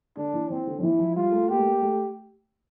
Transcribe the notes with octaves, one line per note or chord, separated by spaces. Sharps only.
D3 D4
E3
E3 C4
D3
F3
E3 E4
F3
G3 F4
A3
A#3 G4
A3
A#3
A3